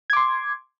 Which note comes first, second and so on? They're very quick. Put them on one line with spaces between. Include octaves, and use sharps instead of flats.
G#6 D6 C6